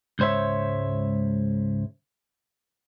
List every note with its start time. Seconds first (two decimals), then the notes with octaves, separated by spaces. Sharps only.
0.19 C#2 G#2 C5 C#5 E5